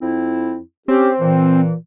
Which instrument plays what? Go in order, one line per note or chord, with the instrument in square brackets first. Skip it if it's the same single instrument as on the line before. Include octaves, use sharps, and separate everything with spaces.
[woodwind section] F2 C4 E4
[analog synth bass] C4 [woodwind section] C#4 G4
[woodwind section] A#2 E3